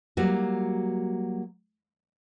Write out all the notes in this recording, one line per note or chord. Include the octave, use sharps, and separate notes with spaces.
F#3 G3 A#3 F#4